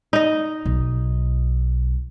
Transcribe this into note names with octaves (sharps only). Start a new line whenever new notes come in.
D#4 D#5
B1